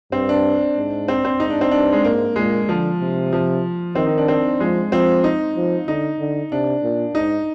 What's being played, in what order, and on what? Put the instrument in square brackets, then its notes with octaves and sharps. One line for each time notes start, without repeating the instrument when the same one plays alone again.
[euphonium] G2 [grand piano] C4
[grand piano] D4
[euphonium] G#2
[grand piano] C4
C4
[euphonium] G#2 [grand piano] D#4
[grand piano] D4
C4
[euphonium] G2 [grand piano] D4
[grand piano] G#3
[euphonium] G#2 [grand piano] A#3
[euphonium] A#2 [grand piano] G#3
[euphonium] D3 [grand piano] F3
[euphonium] C3
[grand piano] F3
[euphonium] D#3 [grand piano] C4
[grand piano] D#4
D4
C4
[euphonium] F3 [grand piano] G#3
[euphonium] F3 [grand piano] C4
[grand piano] D#4
[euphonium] F3
[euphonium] D3 [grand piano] D#4
[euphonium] D3
[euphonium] C3 [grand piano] D4
[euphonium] A#2
[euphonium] G#2 [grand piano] D#4